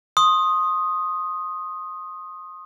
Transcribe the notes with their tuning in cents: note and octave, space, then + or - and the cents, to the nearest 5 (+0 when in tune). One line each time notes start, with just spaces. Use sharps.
C6 +30 D#6 +0